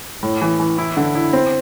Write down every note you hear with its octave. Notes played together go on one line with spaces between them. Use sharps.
A2
E3
E3
E4
D3
E4
C4